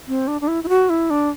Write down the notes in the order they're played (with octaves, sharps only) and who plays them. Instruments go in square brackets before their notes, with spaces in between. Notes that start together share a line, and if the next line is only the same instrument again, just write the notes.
[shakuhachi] C4
D4
D4
E4
E4
F#4
E4
D4